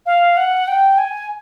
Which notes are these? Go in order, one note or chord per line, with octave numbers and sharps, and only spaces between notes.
F5
F#5
G5
G#5